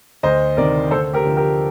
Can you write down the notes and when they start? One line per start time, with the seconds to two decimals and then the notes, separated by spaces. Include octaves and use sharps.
0.23 D2 C5 D#5
0.57 C3 D#3 A#4 D5
0.91 D2 A4 C5
1.13 G4 A#4
1.25 D3 F3
1.37 G4 A#4